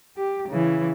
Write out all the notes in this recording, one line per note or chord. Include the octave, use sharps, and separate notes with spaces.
G4
C#3 E3